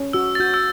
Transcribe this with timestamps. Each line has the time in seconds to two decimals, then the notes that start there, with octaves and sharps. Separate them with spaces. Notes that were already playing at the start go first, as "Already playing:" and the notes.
Already playing: C#4
0.13 F#4 E6
0.35 A6
0.40 F#4 G6
0.54 E6